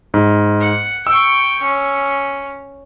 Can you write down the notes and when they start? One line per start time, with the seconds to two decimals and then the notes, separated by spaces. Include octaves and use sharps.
0.14 G#2
0.61 F#5
1.07 G5 C#6 E6
1.62 C#4